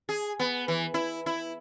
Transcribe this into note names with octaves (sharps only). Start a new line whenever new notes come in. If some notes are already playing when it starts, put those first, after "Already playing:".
G#4
B3
E3
E4
E4